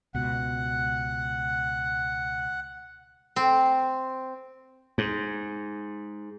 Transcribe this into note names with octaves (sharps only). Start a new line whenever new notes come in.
C#2 B2 F#5
C4
G#2